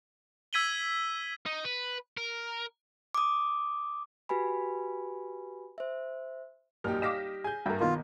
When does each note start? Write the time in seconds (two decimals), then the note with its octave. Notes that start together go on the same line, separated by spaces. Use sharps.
0.53 E6 G#6 B6 D#7 F#7 G7
1.46 D#4
1.64 B4
2.17 A#4
3.14 D6 D#6
4.29 F#4 G4 B4 G#5 B5
5.78 C5 E5
6.84 A#1 F#2 G3 D#4 G4 A#4 F6
7.02 D#5 F5 D6 A#6 B6 E7
7.44 G#4 G#5 G6
7.66 G2 F#4 A#4 E5 G5
7.80 B1 D#3 A#3 B3 F4